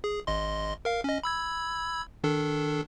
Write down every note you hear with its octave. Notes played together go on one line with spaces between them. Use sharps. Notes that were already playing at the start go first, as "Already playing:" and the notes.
G#4
G#1 D#5 C6
A#4 F5
C#4 D#5
B5 E6 G#6
D#3 D4 A4